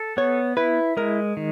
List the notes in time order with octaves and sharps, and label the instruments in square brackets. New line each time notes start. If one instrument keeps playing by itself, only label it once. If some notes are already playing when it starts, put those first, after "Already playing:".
Already playing: [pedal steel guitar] A4
[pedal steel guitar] B3 [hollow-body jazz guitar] C#5
[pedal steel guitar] E4 [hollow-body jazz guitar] B4
[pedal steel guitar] G#3 [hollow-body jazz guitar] A#4
[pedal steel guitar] D#3